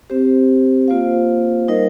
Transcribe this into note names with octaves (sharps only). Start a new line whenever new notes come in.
C4 G4 C5
A#3 F4 C5 F5
G3 D#4 A#4 D#5